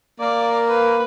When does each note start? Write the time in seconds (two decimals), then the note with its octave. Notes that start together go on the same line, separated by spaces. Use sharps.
0.20 A#3 D5
0.69 B4